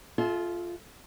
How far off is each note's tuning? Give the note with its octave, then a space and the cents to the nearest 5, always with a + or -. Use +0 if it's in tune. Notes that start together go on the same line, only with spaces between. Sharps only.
F4 +0 A4 -45 E5 -25